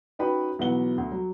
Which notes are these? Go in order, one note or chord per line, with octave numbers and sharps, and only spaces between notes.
C#4 D#4 F#4 B4 G5 B5
B1 E3 F#3 B4 F#5 G7
D2
F#3